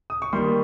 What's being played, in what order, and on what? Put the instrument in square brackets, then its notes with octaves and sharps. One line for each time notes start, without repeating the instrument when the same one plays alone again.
[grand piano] D#6
C#6
D#3 G3 A#3 C6